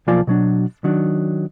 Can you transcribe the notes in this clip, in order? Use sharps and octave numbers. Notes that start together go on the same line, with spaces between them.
B1 F3 A#3 F4 D5 G#5
B2 F#3 D4
D#3 F#3 D4